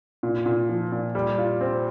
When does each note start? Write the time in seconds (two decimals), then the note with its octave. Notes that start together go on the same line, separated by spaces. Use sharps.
0.23 A#2
0.46 A#2
0.69 F3
0.92 A#2
1.15 G3
1.38 F4
1.61 C4